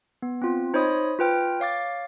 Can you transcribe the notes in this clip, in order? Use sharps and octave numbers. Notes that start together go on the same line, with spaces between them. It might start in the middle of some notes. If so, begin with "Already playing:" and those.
B3
C4 F4
D#4 C5 C#5 D#5 B5 D#6
F4 B4 G5 F6
C#5 F5 D6 A6